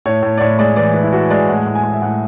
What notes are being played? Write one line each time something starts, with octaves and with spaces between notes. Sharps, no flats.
A2 C#5
A2
D5
A2 C#5
G#3 D5
E3 D5
E3 B4
E4
E3 F#4
G#3 D5
A2 F#5
G#5
A2
G#5
G#3
E5
A2 F#5